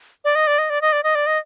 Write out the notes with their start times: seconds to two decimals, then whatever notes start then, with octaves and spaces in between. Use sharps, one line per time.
0.25 D5
0.35 D#5
0.47 D5
0.58 D#5
0.70 D5
0.82 D#5
0.92 D5
1.03 D#5
1.15 D5
1.27 D#5